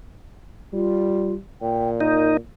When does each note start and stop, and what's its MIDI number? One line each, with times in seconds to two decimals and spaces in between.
0.73 1.36 55
0.73 1.33 65
1.62 2.38 46
1.62 1.89 79
2.01 2.37 63
2.01 2.34 70